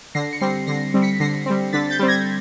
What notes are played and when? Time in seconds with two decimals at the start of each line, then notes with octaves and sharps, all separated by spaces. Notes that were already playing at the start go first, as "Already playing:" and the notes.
0.15 D3 A#6 C7
0.33 C#7
0.41 G3 C4 A#6 C7
0.67 D3 A#6 C7
0.94 G3 C4
1.02 B6 C#7
1.20 D3 A#6 C7
1.46 G3 C4
1.73 D3 A6 B6
1.90 G6 A6
1.99 G3 C4
2.08 G#6 A#6